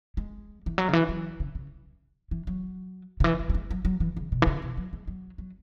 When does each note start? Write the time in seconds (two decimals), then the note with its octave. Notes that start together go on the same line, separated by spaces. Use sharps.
0.17 G#3
0.66 E3
0.78 F#3
0.89 C#3
0.93 E3
1.09 F#3
1.40 C#3
1.55 C#3
2.31 E3
2.47 F#3
3.20 C#3
3.24 E3
3.39 F#3
3.49 F#3
3.54 G#3
3.71 F#3
3.85 F#3
4.00 E3
4.17 C#3
4.32 B2
4.42 E3
4.47 C#3
4.62 B2
4.77 F#3
4.93 G#3
5.07 F#3
5.38 F#3